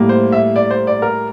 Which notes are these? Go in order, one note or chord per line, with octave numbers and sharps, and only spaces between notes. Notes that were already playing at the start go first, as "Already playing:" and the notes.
Already playing: A2 G3 A#3
C5
E5
D5
C5
D5
A#4